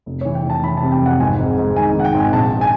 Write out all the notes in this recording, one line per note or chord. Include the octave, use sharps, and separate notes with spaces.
F1
E3 C#5
G5
F1
A5
E3 B5
A5
C3
G5
F2 F#5
G#1 G#5
G#2
G#2
D#3 G#5
D#3 F#5
G5
G#1 G#5
A#1 A5
G#5